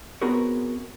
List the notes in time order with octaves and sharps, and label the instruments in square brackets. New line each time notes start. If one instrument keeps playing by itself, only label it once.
[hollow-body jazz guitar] B3 C4 F#4 G#4 A#4 C#5